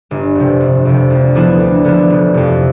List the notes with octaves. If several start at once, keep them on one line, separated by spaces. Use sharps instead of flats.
G1
F2 C3
G1
F2 C3
D2
D3 F3 B3 E4
D2
D3 F3 B3 E4
F1
F2 C3